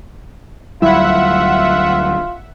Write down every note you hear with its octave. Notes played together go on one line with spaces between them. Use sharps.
D2 F#3 G3 E4 F4 E5 F#5